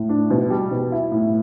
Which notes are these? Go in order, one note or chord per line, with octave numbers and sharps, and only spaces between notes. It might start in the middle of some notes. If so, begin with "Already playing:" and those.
Already playing: A2
D4
B2
G3
B2
E4
A2